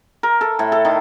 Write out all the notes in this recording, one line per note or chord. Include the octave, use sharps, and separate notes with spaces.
A#4
A4
A2
A4
D#3